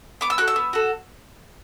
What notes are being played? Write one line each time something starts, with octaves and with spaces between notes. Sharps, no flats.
B3 D6
E6
F#4 A4 F#6
E6
B3
F#4 A4